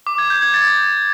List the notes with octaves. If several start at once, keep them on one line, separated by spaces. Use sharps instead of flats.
D6
G#6
G6
G#6
A6